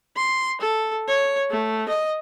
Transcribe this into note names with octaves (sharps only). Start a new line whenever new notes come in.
C6
A4
C#5
A3
D#5